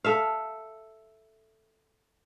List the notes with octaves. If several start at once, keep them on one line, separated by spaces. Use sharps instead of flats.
A4 E5 F5